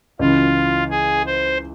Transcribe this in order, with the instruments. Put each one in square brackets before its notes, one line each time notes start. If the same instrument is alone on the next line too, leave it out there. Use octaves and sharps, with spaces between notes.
[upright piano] C#2 C#3 E3 [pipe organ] F4
[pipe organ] G#4
C5